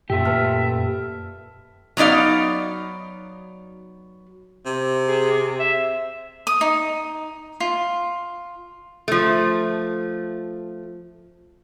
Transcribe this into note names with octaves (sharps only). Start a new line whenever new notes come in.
F#2 A#2 A3 G4 E5
B4 A5 F6
F#3 B3 D#4 D5 F5
C3
G#4
E5
D#6
D#4
F4
F3 A3